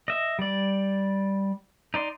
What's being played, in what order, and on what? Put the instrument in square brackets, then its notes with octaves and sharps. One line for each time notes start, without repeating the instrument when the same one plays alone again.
[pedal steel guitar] D#5 E5
G3 D5
D#4 D5 C6